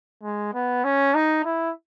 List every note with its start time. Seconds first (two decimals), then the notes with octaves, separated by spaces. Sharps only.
0.23 G#3
0.54 B3
0.84 C#4
1.14 D#4
1.45 E4